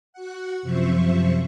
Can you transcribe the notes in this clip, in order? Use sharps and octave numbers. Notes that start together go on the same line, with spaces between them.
F#4 F#5
F#2 C3 F3 C5 E5 C#6